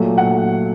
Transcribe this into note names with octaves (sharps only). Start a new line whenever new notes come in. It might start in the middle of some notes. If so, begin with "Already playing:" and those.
Already playing: A#2 F#3 A3
F#5